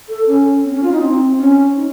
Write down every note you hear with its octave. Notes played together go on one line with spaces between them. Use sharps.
A4
C#4
C4
C#4
F4
D#4
C4
C#4
D#4